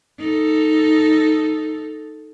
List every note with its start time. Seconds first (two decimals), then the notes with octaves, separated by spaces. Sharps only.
0.19 D#4 A4